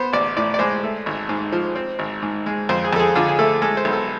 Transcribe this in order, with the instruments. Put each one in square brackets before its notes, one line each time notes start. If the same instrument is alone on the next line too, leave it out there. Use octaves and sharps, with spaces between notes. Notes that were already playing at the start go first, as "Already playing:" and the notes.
Already playing: [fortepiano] B3 C5
A1 D5
A2 D5
D5
G#3 C5
A3
G#1
G#2
F3
C4
G#1
G#2
G#3
F2 C5
G#4
F2 A4
G#4
D3 F4
G#4
A3 A4
G#3 A4
C5
B1
A4